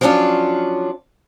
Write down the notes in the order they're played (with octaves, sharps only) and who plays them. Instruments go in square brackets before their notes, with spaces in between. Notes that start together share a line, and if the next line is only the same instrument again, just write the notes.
[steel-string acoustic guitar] F3 F#3 B3 C#4 D4 F4